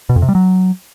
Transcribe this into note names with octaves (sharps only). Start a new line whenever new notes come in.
B2
F2
C3
G3
F#3